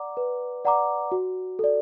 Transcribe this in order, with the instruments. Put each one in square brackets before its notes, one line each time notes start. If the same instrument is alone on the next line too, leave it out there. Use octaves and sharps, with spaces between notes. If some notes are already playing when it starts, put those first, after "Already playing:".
Already playing: [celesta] D5 F#5 A#5 D6
B4
D5 F#5 A#5 D6
F#4
A4 D5